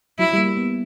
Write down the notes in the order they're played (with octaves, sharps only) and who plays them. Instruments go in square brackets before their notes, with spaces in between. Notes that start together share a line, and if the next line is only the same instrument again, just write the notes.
[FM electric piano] F#3 [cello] E4
[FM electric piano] G3
A#3
B3